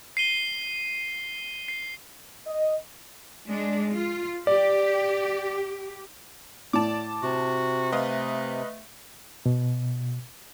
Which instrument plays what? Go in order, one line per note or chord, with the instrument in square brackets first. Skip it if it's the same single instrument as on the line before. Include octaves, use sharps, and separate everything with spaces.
[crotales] C7 D#7 G7
C7
[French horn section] D#5
[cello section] G#3 D4
F4
[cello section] G4 [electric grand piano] D5
[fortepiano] A2 [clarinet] D5 [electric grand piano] A5 D6
[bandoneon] C3 [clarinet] F#4
[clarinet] A3 [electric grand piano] B4 D#5 F5
[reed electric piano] B2